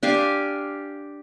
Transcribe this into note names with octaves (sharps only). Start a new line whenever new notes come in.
D4 G4 F5 G#5